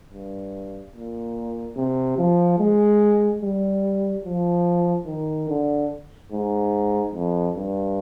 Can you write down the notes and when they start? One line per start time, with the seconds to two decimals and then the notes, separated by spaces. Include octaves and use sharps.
0.11 G2
0.94 A#2
1.76 C3
2.18 F3
2.59 G#3
3.42 G3
4.25 F3
5.07 D#3
5.49 D3
6.32 G#2
7.14 F2
7.56 G2